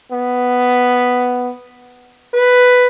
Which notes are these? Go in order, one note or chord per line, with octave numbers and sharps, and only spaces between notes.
B3
B4